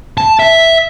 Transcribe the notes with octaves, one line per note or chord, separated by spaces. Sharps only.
A5
E5